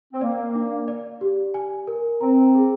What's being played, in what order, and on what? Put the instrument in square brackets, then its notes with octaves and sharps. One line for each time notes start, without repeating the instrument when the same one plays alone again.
[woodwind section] C4
[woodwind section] A#3 [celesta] D5
[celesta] D4
D5
G4
G#5
A#4
[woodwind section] C4 [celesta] A#5
[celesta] G#4